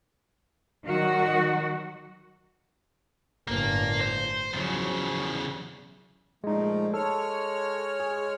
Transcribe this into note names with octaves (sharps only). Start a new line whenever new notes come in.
D#3 F#3 G3 F#4
G1 A2 A#3
C5
E2 C#3 F3 F#3
A#2 F3 G#3 A3 D#4
G#3 A4 C#5 F6
G#4